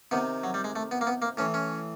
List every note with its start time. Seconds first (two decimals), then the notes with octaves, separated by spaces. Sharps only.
0.11 C3 D#3 B3
0.44 F#3
0.54 G3
0.64 G#3
0.76 A3
0.91 B3
1.01 A#3
1.07 B3
1.22 A#3
1.37 A2 E3 C#4
1.54 C#4